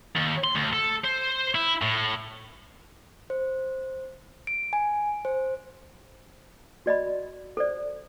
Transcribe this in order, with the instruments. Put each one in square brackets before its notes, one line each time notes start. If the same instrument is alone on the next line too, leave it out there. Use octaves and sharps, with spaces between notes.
[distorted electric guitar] D#2
C6
D2
A4
C5
E4
A2
[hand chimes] C5
D7
G#5
C5
[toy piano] F#4 D5 D#5 B5
A4 C5 D5